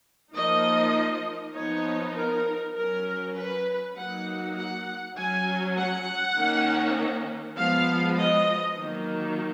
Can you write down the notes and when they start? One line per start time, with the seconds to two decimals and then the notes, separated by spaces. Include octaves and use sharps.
0.34 F3 A#3 D#4 D#5
1.54 F3 B3 D#4 C#5
2.14 A#4
2.75 F#3 C#4 A#4
3.35 B4
3.96 F#3 A#3 D#4 F#5
4.56 F#5
5.16 F#3 C#4 G#5
5.76 F#5
6.37 D#3 A#3 C#4
7.57 F3 G#3 B3 F5
8.17 D#5
8.77 D#3 F#3 A#3